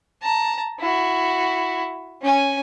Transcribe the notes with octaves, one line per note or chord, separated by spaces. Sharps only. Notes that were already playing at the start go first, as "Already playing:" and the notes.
A5 A#5
E4 F#4
C#4 G#5